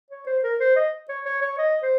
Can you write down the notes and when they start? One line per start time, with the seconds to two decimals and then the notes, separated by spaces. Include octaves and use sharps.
0.11 C#5
0.26 C5
0.43 A#4
0.60 C5
0.76 D#5
1.09 C#5
1.25 C#5
1.42 C#5
1.58 D#5
1.82 C5